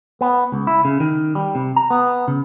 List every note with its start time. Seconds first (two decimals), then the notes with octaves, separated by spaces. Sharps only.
0.21 B3
0.52 C#2
0.67 E4
0.85 C#3
1.00 D#3
1.35 G3
1.55 C3
1.76 A#5
1.90 B3
2.28 C#3